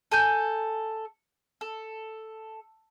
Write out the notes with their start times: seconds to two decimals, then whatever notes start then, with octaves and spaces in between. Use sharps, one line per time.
0.12 A4 G#5 G6
1.61 A4